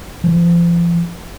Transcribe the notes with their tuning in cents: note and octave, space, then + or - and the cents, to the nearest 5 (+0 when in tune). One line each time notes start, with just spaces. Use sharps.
F3 -35